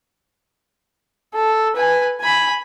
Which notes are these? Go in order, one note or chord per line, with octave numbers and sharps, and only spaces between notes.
A4
B4 G#5
G#5 B5